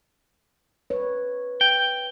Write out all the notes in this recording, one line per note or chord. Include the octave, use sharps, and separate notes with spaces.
B4 C#5
G5